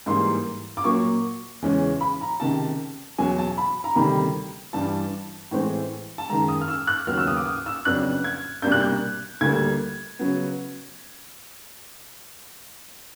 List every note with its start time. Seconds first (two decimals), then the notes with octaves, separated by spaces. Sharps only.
0.06 G#2 E3 G3 A#3 C6
0.77 D6
0.84 A#2 F#3 A#3 C#6
1.62 E2 C#3 E3 G#3 C#4
2.01 B5
2.21 A#5
2.40 C#2 C3 D#3 A5
3.18 E2 B2 F#3 G#5
3.38 A5
3.57 B5
3.84 A#5
3.96 D2 C3 D#3 G3 B5
4.73 G2 E3 G3 A5
5.51 A2 E3 G#3 C4 E4
6.18 A5
6.30 F#2 D#3 G#3 A#5
6.48 D#6
6.61 F6
6.68 E6
6.87 F#6
7.07 D#2 C#3 F#3 B3 F6
7.18 E6
7.27 D#6
7.36 D6
7.46 D#6
7.66 E6
7.85 F2 C#3 F#3 B3 D4 F#6
8.24 G#6
8.62 C2 B2 G3 A#3 D4 G6
8.72 F#6
8.81 G6
9.41 D2 D3 G3 A#3 G#6
10.19 C#3 F#3 B3